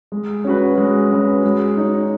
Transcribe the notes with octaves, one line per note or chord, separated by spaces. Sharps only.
G#3
C#4 F#4 B4
G#3
C#4 F#4 B4
G#3
D#4 F#4 C#5